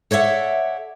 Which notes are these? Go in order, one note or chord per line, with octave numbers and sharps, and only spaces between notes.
A4 C#5 D5 E5 F#5